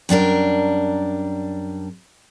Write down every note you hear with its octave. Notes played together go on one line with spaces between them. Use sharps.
F#2 G3 D4 A#4